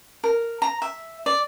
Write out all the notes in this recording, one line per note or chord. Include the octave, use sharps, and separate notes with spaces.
A#4
A#5
E5
D5